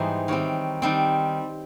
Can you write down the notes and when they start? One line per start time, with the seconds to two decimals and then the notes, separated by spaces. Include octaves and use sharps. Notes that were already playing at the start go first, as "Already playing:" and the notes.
Already playing: G#2 E3 G3 B3 D#4 C5
0.28 D#3 G3 C4 C#5
0.82 D#3 G3 C4